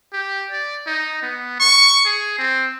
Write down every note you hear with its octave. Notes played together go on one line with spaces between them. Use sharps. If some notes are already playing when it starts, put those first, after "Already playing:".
G4
D5
D#4
B3
C#6
G#4
C4